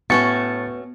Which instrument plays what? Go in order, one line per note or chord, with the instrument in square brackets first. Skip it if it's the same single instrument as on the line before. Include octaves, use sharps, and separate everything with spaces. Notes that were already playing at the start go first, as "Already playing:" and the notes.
[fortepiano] A2 [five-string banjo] A3 C#4 F#4 [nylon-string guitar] B3 [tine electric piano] A6 C#7